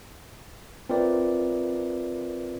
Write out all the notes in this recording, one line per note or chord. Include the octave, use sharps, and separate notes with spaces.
C4 F4 A#4 B4 D5 E5